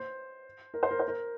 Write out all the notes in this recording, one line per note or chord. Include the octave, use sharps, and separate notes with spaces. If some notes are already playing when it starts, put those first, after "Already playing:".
Already playing: C5
A#4
C5
A#4
C5
A#4